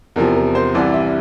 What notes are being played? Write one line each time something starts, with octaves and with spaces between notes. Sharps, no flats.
E2 C3 F3 A#4
A#4
C5
C2 C3 E3 D5
E5